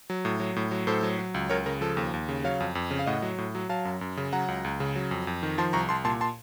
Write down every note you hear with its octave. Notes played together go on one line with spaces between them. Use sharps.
F#3
A2
F#3
A2
F#3
A2 A4 C5
F#3
F#3
C#2
C#2 A#4 C#5
C#3 A#4
F3 A4
D#2
D#2
C#3
F#3 C#5 F5
F2
F2
C#3
F5
A2 D#5 F#5
F#3
A2
F#3
F#3 F5 A5
F#2
F#2
C#3
F#3 F#5 A#5
C#2
C#2
C#3
F#3
F2
F2
D#3
F3 A5 C6
C2 A#5 C#6
C2 A5 C6
A#2 A5 C6
A5 C6